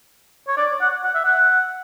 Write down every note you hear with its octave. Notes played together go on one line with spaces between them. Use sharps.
C#5
D5
F#5
F#5
E5
F#5